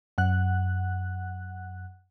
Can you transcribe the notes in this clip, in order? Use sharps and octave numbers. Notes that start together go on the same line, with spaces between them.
F#2 F#5 F#6